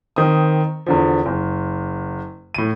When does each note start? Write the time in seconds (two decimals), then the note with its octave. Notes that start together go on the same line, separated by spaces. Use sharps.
0.16 D#3 C4 D#6
0.86 E2 D3 F3
1.26 F#1
2.54 A2 D#7